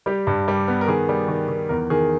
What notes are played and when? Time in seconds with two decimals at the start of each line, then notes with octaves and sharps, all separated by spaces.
0.06 G3 G4
0.27 G2
0.48 G3
0.68 B3
0.81 A#4
0.88 D#3 G#4
1.09 G3
1.28 D#3
1.48 D#3
1.69 E2 A#4
1.90 D#3 G#4